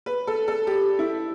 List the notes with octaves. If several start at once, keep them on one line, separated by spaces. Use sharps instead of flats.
B4
A4
A4
G4
E4